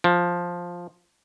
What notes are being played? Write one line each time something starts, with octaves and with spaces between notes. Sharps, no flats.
F3